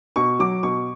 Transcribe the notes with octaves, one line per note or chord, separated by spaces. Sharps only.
B2 C#6
F#3 D6
B2 C#6